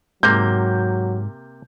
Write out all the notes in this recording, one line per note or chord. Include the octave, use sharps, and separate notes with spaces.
G#2 C3 F#3 A#3 G6